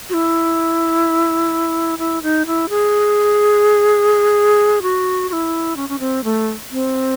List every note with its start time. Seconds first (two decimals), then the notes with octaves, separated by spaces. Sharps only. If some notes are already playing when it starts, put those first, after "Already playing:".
0.10 F#4
0.14 E4
1.99 E4
2.23 D#4
2.46 E4
2.69 G#4
4.82 F#4
5.29 F#4
5.33 E4
5.77 C#4
5.89 C#4
6.00 C4
6.24 A3
6.71 C4